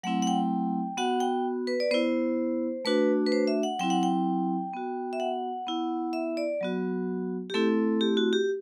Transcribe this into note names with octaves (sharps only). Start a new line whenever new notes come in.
F#3 A3 C4 E4 F#5
F#5
G5
B3 F#4 F#5
G5
B4
D5
B3 E4 C5
A3 D4 F#4 B4
B4
C5
E5
F#5
F#3 C4 E4 G5
F#5
G5
B3 F#4
E5
F#5
B3 E4
E5
D5
F#3 B3 F#4
G4
A3 C4 E4 A4
G4
F#4
G4